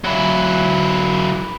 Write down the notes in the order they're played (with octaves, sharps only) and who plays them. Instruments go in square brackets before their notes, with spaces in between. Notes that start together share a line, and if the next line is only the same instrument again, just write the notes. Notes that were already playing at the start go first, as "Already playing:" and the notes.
[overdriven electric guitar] F#3 E4